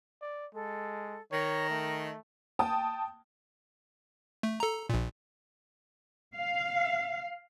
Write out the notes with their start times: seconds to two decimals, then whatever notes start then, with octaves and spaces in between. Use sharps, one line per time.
0.22 D5
0.54 G#3 A4
1.32 D#3 C#5 A#5
1.69 A3
2.59 G5 A5 D#6
4.43 A3
4.60 A4 A#5
4.89 A#1 A#2
6.35 F5